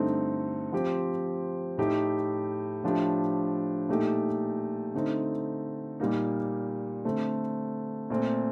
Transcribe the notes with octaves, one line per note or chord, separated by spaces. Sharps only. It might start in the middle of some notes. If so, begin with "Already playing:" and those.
Already playing: G2 D3 A3 C4 D#4
F3 C4 G4
A2 A3 D#4 G4
A2 F3 A3 D4 G4
A#2 A3 D#4 G4
D3 A3 C4 D#4
A#2 G3 A#3 D#4
D3 A3 C4
A#2 A3 C4